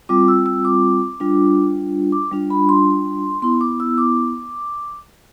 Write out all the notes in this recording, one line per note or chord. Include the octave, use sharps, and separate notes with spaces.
G3 C4 F4 D6
E6
E6
D6
G3 D4 F4
D6
G3 D4 F4
B5
C6
B3 E4 C6
D6
E6
D6